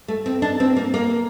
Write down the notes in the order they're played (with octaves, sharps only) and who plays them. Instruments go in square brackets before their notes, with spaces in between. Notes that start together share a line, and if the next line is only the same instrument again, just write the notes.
[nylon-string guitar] A3
C4
D4
C4
A#3
A#3